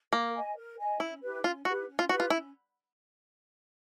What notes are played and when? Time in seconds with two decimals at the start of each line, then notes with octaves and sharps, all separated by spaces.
0.12 A#3 A#4
0.35 D#5 G#5
0.56 A#4
0.78 D#5 G#5
1.00 C#4 E4
1.21 E4 G4 B4
1.44 C#4 F4
1.65 E4 F#4 G4 B4
1.88 C#4
1.99 F4
2.09 E4 F#4 G4 B4
2.20 F4
2.30 C#4 E4